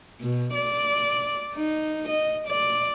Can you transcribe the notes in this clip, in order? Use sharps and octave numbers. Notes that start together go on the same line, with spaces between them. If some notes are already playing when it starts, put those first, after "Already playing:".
B2
D5
D#4
D#5
D5